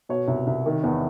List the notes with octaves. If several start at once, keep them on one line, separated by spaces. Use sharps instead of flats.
B2 C#5
C2
C2
D#3
E2